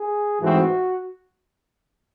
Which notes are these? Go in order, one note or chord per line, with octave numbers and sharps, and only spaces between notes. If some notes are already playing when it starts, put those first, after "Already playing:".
Already playing: G#4
G#2 E3 A3 C4 F#4